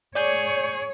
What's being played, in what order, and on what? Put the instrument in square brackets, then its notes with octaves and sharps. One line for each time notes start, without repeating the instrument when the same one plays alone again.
[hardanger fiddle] G#4 [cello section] C#5 [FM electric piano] D5 G6